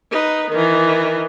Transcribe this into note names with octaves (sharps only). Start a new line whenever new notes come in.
D#4 B4
D#3 E3